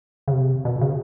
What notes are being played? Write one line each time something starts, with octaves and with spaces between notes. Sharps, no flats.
C#3
C3
B2
C#3